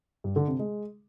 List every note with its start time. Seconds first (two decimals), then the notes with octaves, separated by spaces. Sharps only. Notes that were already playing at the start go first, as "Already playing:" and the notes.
0.24 G2
0.36 D3
0.48 C3
0.59 G#3